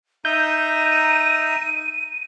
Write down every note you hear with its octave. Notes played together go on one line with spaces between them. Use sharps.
D#4 E5 A#5 G6 D#7